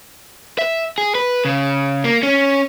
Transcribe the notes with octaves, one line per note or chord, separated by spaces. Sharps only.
E5
G#4
B4
C#3
A#3
C#4